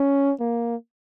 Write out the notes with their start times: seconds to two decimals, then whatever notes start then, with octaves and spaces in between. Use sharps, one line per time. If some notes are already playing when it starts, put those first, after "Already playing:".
Already playing: C#4
0.40 A#3